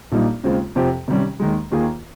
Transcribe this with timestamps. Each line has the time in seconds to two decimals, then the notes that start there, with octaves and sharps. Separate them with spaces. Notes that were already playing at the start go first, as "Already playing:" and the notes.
0.12 A#1 A#2 G3 A#3 D#4
0.44 D#2 C#3 G#3 C4 F4
0.75 F2 C3 F3 C4 G4
1.08 C3 D#3 G3 C#4
1.40 D#2 D#3 G#3
1.71 D#2 D#3 A#3 F4 G#4